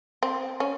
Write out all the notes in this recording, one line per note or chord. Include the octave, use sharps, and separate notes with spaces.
C4
C#4